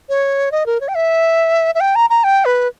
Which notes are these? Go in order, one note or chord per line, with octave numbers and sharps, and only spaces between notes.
C#5
D#5
A#4
C#5
G5
E5
E5
G5
A#5
A#5
G5
B4